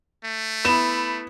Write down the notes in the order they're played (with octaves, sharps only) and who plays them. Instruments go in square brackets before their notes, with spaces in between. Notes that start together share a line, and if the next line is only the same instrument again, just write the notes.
[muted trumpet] A3
[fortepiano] B3 E4 [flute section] B5 [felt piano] E7